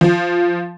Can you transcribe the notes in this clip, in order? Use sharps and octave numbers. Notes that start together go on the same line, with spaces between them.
F3